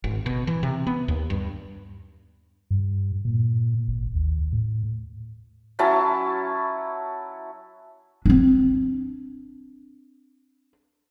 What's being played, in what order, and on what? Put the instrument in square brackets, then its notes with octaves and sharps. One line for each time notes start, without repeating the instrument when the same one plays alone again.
[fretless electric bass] G#1
B2
E3
C3
B3
D#2
G2
[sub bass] G2
A#2
G#1
D#2
A2
[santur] F#3 C#4 E4 A5
[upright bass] C4 D4